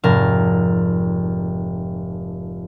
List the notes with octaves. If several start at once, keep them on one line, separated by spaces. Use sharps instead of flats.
F1 G#2 A#4 A5